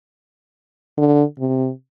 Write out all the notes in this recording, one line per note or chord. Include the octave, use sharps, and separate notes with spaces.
D3
C3